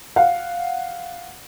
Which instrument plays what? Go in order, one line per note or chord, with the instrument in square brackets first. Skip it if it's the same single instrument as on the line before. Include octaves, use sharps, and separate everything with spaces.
[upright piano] F5 F#5